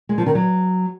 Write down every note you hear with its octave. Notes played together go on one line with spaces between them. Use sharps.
G#3
F3
D#3
F#3